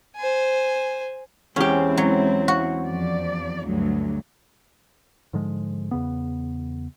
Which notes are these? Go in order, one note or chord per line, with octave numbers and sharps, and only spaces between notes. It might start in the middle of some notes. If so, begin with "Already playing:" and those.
C5 G#5
E2 G#3 C4 C#4 E4 G4
F#3
F#4
F2 F3 D5
D2 G2 F#3
G#2 D3 F3 G#3
E2 C#3 B3